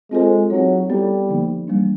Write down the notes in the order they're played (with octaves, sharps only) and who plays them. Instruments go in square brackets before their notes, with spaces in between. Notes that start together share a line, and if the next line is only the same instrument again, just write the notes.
[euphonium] G#3 [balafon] C4 F4 A4 C5
[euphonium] F#3 [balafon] C4 D#4 G#4 C#5
[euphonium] G3 [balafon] B3 E4 A4
[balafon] D3 F3 A#3 D#4
E3 G3 A#3 D4